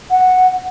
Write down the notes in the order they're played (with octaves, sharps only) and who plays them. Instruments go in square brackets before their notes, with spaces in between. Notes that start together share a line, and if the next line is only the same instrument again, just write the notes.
[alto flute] F#5